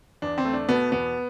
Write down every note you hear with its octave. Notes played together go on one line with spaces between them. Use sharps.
E2 D4
C4
A3
D4
B2 B3
E2 B3